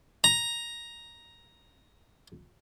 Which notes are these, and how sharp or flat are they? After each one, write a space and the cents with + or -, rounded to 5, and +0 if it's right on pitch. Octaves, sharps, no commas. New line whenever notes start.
A#5 +10